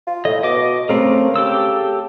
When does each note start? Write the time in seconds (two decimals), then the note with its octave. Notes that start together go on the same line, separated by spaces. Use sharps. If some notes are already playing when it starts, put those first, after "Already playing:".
0.07 F4
0.25 A2 D#5
0.43 B2 D#5 D6
0.89 C#3 A3 C4 A#4
1.36 G4 A4 E6